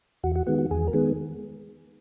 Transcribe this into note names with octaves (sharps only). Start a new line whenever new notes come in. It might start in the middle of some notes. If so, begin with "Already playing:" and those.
E2 F#4
F#4
D#3 G#3 B3 F#4
F#4
E2 G#4
A#4
D#3 G#3 B3 G#4